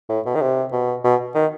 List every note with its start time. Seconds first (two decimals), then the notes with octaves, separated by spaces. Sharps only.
0.09 A2
0.26 B2
0.35 D#3
0.41 C3
0.72 B2
1.04 B2
1.35 D#3